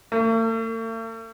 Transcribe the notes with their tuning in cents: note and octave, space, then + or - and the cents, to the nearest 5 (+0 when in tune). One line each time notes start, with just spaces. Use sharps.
A3 +45